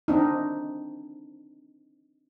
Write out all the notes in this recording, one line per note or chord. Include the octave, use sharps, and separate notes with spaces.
C4 D4 D#4